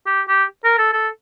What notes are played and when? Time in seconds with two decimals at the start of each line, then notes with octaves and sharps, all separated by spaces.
0.06 G4
0.29 G4
0.65 A#4
0.79 A4
0.93 A4